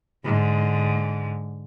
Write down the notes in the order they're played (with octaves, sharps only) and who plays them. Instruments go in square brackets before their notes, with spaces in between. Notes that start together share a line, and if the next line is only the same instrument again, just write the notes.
[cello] G#2 D3